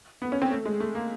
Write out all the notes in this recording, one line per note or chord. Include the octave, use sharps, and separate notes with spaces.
B3
C#4
C4
A3
G#3
A3
A#3